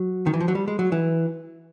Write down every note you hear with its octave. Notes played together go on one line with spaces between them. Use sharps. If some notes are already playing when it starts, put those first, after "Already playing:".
Already playing: F#3
D#3
E3
F3
F#3
G3
G#3
F#3
E3